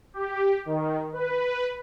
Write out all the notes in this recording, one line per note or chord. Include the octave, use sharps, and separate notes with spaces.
G4
D#3
B4